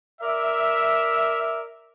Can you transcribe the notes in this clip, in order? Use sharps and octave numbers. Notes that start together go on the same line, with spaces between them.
A#4 D5 E5